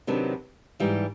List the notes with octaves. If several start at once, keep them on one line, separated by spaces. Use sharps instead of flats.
C3 D#3 F#3 B3 D4
G#2 E3 G3